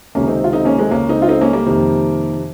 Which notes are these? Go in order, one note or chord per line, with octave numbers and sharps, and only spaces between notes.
C#2 C3 D#3 A#3 C#4
C4 D#4
F4
C4 D#4
A#3 C#4
G#3 C4
C#2 C#3 A#3 C#4
C4 D#4
F4
C4 D#4
A#3 C#4
G3 A#3
F2 C3 D#3